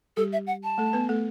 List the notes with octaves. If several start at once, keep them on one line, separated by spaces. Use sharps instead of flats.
G3 G4 A4
E5
F#5
A5
A3 A4
B3 B4
A3 A4